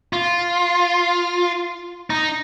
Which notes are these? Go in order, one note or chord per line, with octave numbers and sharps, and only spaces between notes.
F4
D#4